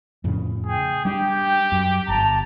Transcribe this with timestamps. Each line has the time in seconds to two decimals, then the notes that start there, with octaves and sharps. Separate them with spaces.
0.24 F2 A2 C#3
0.66 G#4 G5
1.05 G3 D4 G4
1.72 F#2
2.08 G1 A5 A#5